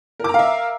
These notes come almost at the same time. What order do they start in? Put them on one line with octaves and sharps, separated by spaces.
A#4 D6 A#5 F5 E5